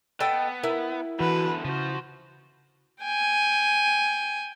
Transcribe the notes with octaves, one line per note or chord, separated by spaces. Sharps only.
B3 A4 D#5 G5
E4 A#4
E2 D3 E3 F#4 B4
C#3 F3 F#4 C5
G5 G#5